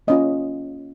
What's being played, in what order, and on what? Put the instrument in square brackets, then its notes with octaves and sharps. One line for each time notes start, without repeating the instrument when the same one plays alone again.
[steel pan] A#3 C#4 F4 D#5